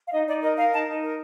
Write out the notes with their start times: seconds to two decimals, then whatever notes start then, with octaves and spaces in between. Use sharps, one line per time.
0.07 F5
0.11 D#4 D#5
0.26 D#4 D5
0.42 A#4 D#5
0.57 A#4 F5
0.72 D#4 A5
0.87 D#4
1.03 A#4